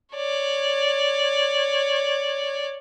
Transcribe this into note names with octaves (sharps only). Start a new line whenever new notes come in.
C#5 D5